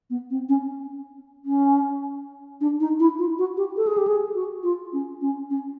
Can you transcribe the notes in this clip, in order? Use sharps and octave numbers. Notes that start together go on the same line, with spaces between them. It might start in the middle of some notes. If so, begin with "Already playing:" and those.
B3
C4
C#4
C#4
D4
D#4
E4
F4
F#4
G4
A4
G#4
G4
G#4
F#4
F4
C#4
C#4
C#4